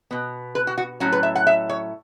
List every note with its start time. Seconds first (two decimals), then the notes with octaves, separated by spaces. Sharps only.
0.11 B2 B3
0.55 B4
0.67 F#4
0.78 F#4
1.00 A2 F#3 C#4 F#4
1.13 B4
1.23 E5
1.35 F#5
1.47 E5
1.69 C#5